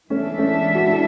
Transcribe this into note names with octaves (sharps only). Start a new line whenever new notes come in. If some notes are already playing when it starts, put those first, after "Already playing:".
E3 G#3 A3 C#4 D4 A4 E5
A3 C#4
F#4
E4